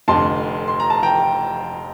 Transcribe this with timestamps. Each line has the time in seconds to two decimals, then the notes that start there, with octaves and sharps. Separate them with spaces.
0.08 F1 F2 D3 A5 C6
0.68 C6
0.80 A#5
0.90 A5
1.03 G5 A#5